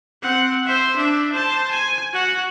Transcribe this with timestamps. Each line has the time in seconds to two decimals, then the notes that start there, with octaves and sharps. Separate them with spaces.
0.22 C4 F#5
0.66 C5 E5
0.97 D4 E5
1.33 C5 A5
1.72 G#5
2.13 F#4 F#5